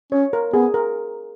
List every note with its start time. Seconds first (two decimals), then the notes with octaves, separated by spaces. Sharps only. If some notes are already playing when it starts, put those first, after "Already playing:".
0.12 C#4 C#5
0.33 A#4
0.54 B3 G#4
0.74 A#4